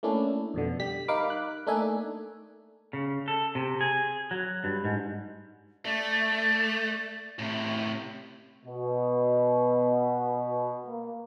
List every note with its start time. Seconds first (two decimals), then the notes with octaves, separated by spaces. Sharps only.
0.03 A3 A#3 C#4 D4 E4
0.54 F2 B2 D3
0.80 G3 G4 B6
1.08 D#4 A#4 F5 B5 D6
1.30 F#6
1.67 A3 A#3 D4 D#4 E5 G#5
2.93 C#3
3.28 A4
3.55 C3
3.81 G#4
4.31 F#3
4.64 G2
4.84 G#2
5.85 A3 D5
7.39 A2 C3
8.66 B2
10.86 A#3